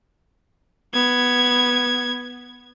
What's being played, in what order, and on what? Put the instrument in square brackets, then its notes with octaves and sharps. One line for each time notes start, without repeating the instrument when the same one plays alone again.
[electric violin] B3 G#6